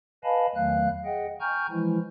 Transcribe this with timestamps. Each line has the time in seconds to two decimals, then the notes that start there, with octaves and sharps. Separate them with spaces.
0.24 B4 D#5 F5 G#5 A5 B5
0.55 E2 D#3 F#3 A3 F5 F#6
1.05 G#4 D#5 F#5 G5
1.41 G5 G#5 A#5 C#6 F6 G6
1.71 E3 F3 G#3 E4